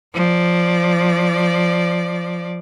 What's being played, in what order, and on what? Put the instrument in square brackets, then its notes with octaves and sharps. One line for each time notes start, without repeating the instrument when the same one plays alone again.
[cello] F3 D5